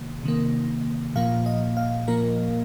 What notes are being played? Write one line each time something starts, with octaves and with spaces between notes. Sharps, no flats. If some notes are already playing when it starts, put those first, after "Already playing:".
Already playing: C3 D#3 A#3
C3 D#3 A#3
A#2 F3 A#3 F5
D#5
F5
A#2 F3 A#3 A#4